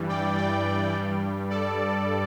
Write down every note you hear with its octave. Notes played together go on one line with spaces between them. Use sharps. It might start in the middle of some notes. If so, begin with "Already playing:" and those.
Already playing: G2 E3 G3
D5 G5
D5 G5
G2 G3
A4 D5